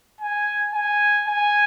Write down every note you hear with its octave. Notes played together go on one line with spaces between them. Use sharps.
G#5
G#5
G#5